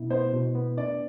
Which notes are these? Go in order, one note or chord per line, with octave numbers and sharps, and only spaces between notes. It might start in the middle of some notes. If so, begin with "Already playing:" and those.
Already playing: B2 B3 E4
B3 C5
B2
B3
D4 D5